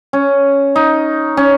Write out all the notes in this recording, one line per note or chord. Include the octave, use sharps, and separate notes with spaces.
C#4
D#4
C#4